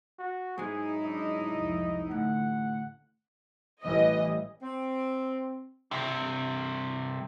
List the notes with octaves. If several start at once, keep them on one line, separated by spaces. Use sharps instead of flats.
F#4
G#2 F#3 G#3 D#4 E4 G#4
D4 D#5
C2 F2
A1 A2 D3 F#5
A1 E3 G3 D#5
C4
G2 C3